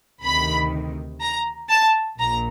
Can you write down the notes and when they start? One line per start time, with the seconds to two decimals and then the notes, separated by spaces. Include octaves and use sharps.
0.23 D2 C3 D#3 B5
1.21 A#5
1.69 A5
2.19 A#1 A#2 A#5